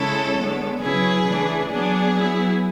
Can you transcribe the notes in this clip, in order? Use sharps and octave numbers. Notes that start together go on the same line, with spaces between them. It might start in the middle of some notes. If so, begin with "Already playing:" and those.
Already playing: C#3 G#3 C#4 E4 A4 C#5
D3 G#3 B3
C#3 F#3 C#4 E4 G#4 B4
C#3 E3 A3 D4
F#3 B3 D4 G#4
F#3 B3 E4